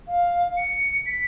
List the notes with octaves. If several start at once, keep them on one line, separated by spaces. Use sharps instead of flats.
F5
C#7
B6